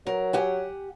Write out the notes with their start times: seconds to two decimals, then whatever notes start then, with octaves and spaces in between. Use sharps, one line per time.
0.07 F#3 A#4
0.33 G4 F#5 G#5